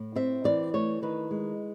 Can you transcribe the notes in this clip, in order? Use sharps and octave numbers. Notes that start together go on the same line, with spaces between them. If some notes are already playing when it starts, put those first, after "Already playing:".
Already playing: A2
C4 E5
E3 D5
A3 C#5
D#3 B4
G#3